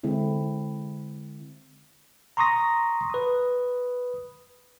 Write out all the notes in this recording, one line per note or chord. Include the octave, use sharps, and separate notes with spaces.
D3 G#3 C4 E4
A#5 C6 C#6 D#6 A#6
B4 D#6